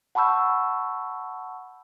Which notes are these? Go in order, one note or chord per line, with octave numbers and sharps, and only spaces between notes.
F#5 A5 B5 C#6 E6 G6